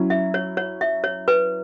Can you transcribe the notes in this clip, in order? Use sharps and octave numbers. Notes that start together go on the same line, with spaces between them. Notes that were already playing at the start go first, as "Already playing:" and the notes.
Already playing: F#3 C#4 E4
E5
C#5
C#5
E5
C#5
B4